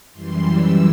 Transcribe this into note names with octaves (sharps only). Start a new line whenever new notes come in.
F#2 E3 G3 C6
E6